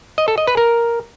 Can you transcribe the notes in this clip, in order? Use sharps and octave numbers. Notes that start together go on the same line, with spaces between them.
D#5
A4
D#5
B4
A#4